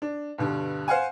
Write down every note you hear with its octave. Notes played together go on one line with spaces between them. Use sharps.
D4
G2 B2 D3 G3
C5 F5 F#5 G#5